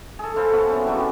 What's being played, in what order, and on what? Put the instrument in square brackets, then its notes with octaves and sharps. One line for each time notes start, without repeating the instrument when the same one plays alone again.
[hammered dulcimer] G#4 A4
A4 B4 C5 F5
B3 F#4 F#5 A5
C#3 E4
C#3 F#3 G3 C4